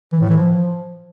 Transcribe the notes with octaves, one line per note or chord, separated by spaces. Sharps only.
E3
A2
E3
F3